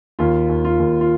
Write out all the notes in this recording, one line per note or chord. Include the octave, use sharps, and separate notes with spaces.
D#2 F4
D#2
F4
D#2
F4